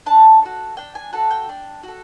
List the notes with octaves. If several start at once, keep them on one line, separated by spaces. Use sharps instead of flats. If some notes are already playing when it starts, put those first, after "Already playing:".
D4 A5
F#4 A4
D4 G5
G#5
F#4 A4 A5
G5
D4
F#4 A4